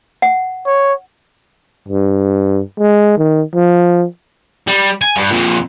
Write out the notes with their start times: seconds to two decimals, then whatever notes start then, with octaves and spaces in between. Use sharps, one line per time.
0.22 F#5
0.66 C#5
1.88 G2
2.79 G#3
3.18 D#3
3.55 F3
4.67 G3
5.02 G#5
5.16 G2
5.31 F2 A#2